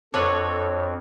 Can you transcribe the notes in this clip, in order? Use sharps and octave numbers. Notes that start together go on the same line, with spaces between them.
F2 D4 F#4 A4 B4 C#5